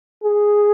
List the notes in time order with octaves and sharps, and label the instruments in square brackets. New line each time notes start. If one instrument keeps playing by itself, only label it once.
[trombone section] G#4